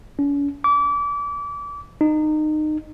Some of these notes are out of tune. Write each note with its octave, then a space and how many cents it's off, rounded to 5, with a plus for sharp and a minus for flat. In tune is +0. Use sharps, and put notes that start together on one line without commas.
C#4 +45
D6 -30
D#4 -25